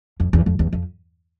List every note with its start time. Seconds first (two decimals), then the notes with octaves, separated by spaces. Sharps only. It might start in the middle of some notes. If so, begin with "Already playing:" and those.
0.20 F2
0.33 E2
0.46 F2
0.59 E2
0.73 F2